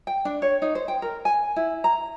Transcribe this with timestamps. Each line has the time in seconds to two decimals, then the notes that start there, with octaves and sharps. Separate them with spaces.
0.07 G5
0.25 D4
0.42 C#5
0.62 D#4
0.75 C5
0.88 G5
1.02 A#4
1.25 G#5
1.56 E4
1.84 A#5